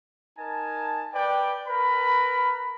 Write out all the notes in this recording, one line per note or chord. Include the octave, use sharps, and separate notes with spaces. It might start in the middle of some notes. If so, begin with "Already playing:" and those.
D#4 A#4 G#5 A5
B4 D5 G5
A#4 B4 B5